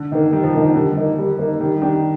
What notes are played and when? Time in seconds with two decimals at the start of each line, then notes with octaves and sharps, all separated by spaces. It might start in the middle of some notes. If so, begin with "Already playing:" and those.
Already playing: D3
0.12 D#3 A#3 D#4
0.32 D#3 G3
0.44 F3
0.54 D3 A#3 D#4
0.64 D#3
0.75 D3 G3
0.97 A#3 D#4
1.19 G3
1.39 A#3 D#4
1.60 D#3 G3
1.82 D#3 D4 G4